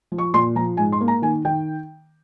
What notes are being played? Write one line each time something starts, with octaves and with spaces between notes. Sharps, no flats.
F3
C#6
A#2 C6
F3 A#5
G#2 G#5
C6
A#3
A#5
D#3 G#5
D#3 G5